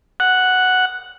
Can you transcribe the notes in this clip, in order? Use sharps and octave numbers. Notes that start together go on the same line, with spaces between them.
F#5